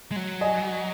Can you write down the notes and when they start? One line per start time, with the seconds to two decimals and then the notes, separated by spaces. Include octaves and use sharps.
0.12 G#3
0.16 F#3
0.41 D#5 G#5